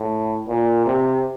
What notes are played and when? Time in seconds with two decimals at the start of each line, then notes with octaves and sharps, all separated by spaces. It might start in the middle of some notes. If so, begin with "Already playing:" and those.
Already playing: A2
0.48 A#2
0.86 C3